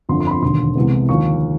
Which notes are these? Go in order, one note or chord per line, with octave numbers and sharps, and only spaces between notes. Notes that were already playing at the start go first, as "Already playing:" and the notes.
G1 F2 D3 C6
C6
B5
C6
E1 D#2 D3 C6
C2 C3 E3 G#3 B3
D#2 D3 F3 C#6